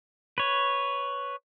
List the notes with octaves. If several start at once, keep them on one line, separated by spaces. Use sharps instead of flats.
B4 C#5